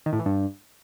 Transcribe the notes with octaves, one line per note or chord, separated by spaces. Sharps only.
D#3
A2
E3
G2